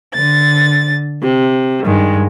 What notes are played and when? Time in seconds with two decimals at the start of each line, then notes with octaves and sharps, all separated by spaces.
0.14 D3 A6
1.22 C3
1.84 G2 D#3 G#3